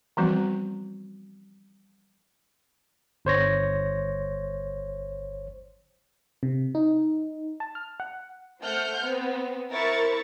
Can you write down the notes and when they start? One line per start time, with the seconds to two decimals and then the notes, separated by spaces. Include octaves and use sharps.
0.17 E3 F3 G3 B3 C4 F#4
3.25 G1 C5 C#5 A#6
6.43 C3
6.75 D#4
7.60 A5
7.75 F6
8.00 F#5
8.60 A3 C5 F#5 F6 G6
9.03 B3 C4
9.71 E4 A#4 C5 C#6 A6